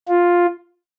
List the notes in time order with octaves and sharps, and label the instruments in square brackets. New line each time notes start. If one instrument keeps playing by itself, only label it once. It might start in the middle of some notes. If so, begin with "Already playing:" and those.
[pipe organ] F4